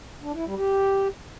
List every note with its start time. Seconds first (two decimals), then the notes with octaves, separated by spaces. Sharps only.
0.22 D4
0.33 E4
0.45 G3
0.57 G4